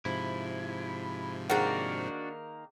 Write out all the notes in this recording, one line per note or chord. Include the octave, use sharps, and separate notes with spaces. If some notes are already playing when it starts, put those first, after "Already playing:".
G#2 C3 F3 E4
D#3 A#3 D4 F#4 G#4 C5 F#5